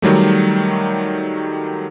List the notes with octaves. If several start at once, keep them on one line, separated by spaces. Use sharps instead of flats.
D#3 F#3 G3 A3